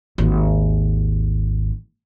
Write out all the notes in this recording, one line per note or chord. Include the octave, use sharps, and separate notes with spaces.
G#1 D#2